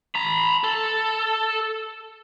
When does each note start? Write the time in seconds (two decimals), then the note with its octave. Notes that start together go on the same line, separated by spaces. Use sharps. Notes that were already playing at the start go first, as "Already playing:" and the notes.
0.15 A#5 B5
0.64 A4